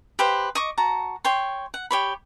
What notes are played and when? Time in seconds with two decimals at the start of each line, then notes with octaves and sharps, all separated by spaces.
0.19 G4 B4 C5 F5
0.55 D#5 C#6 D6
0.78 F#4 A5 A#5
1.25 C#5 G5 C6
1.74 F#5
1.91 G4 C#5 B5